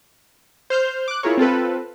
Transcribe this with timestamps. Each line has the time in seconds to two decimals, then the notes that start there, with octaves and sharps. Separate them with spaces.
0.70 C5 F6 G6
1.08 D6 F#6
1.23 E4 F4 G#4 A#4 C#5
1.37 C4 F4 A4 B4